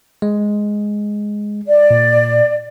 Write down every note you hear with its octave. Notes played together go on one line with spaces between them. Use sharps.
G#3
D5
A#2